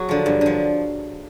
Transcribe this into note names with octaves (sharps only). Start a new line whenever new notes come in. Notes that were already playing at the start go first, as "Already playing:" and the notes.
Already playing: F#3 F#4 G#4
D3 F3
G2
D3 F3